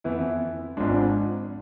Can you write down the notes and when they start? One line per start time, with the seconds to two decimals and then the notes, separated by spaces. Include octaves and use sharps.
0.04 F2 E3 B3 E4
0.77 G#1 G#2 F3 G#3 D4